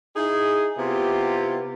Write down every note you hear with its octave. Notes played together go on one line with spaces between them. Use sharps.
D#4 E4 G#4
C3 B3 E4 F4 G4